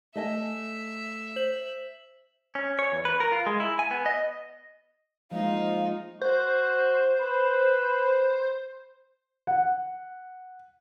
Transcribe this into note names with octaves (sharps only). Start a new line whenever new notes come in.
A3 D#5 E5 G#5
C5 F#7
C#4
C#5
E2
B4
A#4
F4
G#3
E4
G#5
B3
D#5
F3 G#3 A#3 D#4 F4 F5
F#4 C5
B4
F#5